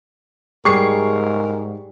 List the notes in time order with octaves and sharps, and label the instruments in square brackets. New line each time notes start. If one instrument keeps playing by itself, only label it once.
[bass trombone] G#2 [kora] G3 G#4 [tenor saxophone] A#4 [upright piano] C#6 C7